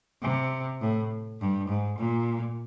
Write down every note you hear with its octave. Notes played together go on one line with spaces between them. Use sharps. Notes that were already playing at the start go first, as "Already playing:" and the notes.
C3
A2
G2
G#2
A#2